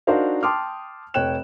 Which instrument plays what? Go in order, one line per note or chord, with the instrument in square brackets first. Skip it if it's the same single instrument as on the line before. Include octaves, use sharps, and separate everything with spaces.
[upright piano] D4 D#4 F#4 A#4 C5 F5
G5 A5 C6 D6 D#6 F6
F1 C#5 G5 F#6 E7